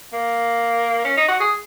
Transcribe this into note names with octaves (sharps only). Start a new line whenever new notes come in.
A#3
C#4
D#4
F#4
G#4